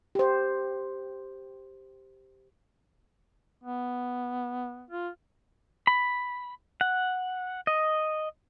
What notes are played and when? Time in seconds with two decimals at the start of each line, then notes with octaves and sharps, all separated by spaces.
0.15 G4 C5
3.63 B3
4.90 F4
5.87 B5
6.81 F#5
7.67 D#5